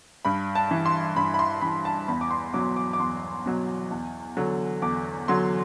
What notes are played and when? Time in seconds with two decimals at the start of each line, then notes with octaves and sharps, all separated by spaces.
0.25 G2 B5
0.55 A5
0.71 E3
0.86 C6
1.16 G2 B5
1.34 B5
1.39 C6
1.62 E3 B5
1.85 A5
2.08 E2 B5
2.21 D6
2.31 C6
2.54 B2 F#3 D6
2.76 D6
2.93 D6
2.99 E2 C6
3.46 B2 F#3
3.91 E2
4.37 D3 F#3
4.82 E2 D6
5.28 D3 F#3 C6